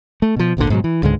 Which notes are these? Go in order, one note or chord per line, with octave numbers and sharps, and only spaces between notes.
A3
B2 F3
G#1 D2 A#2 D3
G#2 B2 F3 F#3
E3
C#2 G#2 D3 G#3